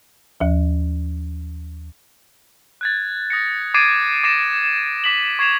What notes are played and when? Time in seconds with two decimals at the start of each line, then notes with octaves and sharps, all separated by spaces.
0.40 D#2 F3
2.81 F#6 G#6 A6
3.30 D#6 A#6 C#7
3.74 D6 G#6 A6 C7 D7 D#7
4.24 D6 A6 A#6 C7 E7
5.04 D6 B6 F#7
5.39 C#6 G#6 C7 E7 F7